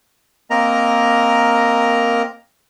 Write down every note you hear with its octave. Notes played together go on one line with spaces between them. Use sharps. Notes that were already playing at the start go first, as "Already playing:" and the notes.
A#3 C4 A#4 D#5 A#5